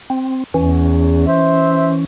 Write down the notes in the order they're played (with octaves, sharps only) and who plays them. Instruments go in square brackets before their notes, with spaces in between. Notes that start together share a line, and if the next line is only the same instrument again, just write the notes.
[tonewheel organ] C4
[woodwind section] E2 [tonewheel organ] E3 C#4
[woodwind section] C5 E5